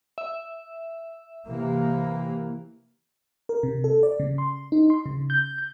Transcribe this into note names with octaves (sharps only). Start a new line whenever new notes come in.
E5
C3 E3 A#3
A#4
C3
A4
D5
C#3
C6
D#4
C6
C#3
G6
G6